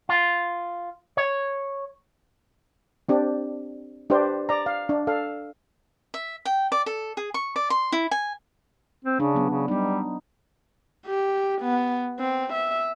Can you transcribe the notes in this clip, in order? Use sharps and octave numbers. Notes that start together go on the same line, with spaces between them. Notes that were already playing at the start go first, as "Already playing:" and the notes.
F4
C#5
C4 D4 G4
D4 G4 B4 C5 D5
D5 A#5
F5
D4
A4 F5
E5
G5
D5
A4
G#4
C#6
D5
C6
E4
G#5
C4
C#3 D4
F#3 B3
C#3
G3 B3 D#4
G4
B3
C4
E5